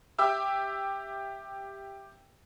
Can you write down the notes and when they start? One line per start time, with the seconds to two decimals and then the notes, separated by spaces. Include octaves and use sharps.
0.18 G4 E5 G5 D6 E6